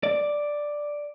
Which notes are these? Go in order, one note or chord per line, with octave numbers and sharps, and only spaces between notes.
D5